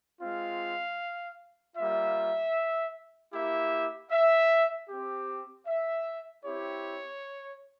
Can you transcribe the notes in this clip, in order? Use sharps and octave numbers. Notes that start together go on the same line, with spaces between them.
G#3 C4 F4 F5
G3 A#3 F4 E5
A#3 E4 G4 E5
E5
C4 G4
E5
C4 E4 G4 C#5